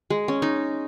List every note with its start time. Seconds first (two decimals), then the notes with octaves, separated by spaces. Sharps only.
0.10 G#3
0.28 C#4
0.42 D#4